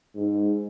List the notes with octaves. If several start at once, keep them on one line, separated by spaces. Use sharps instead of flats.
G#2